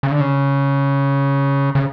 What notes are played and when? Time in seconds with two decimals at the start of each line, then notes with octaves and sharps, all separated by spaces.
0.03 C#3
0.11 D3
0.21 C#3
1.75 C#3